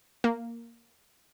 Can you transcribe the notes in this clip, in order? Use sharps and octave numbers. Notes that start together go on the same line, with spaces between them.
A#3